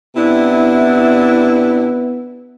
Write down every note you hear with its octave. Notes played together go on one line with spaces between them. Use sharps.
C3 B3 D4 E4